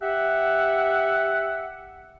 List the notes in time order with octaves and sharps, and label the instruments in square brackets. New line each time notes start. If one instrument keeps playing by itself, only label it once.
[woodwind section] G4 E5 F#5